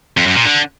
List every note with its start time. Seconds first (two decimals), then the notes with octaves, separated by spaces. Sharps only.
0.17 F2
0.26 F#2
0.36 A#2
0.45 D3